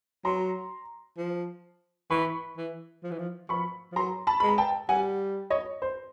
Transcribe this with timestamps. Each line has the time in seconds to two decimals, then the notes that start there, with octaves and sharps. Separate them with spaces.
0.25 F#3 A#5 C6
1.18 F3
2.10 E3 B5 C#6
2.57 E3
3.03 F3
3.11 E3
3.19 F3
3.49 F3 B5 C#6
3.92 F3
3.96 F#3 A#5 C6
4.27 A5 B5
4.40 G#3 B5
4.49 A#5
4.58 G5 A5
4.89 G3 F#5 G#5
5.50 C#5 D#5
5.82 C5